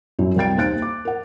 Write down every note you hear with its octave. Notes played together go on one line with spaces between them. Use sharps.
F#2 F#3 E4
C2 A#4 G5 A6 D7
D#2 C5 F#6 A6 D7
D6
A#4 F#5